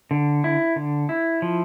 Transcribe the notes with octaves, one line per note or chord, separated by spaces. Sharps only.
D3
E4
D3
E4
F3